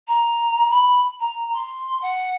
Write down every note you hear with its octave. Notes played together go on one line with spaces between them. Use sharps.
A#5
B5
A#5
C6
F#5